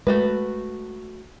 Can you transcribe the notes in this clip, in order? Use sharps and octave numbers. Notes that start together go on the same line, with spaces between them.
G#3 A3 F#4 B4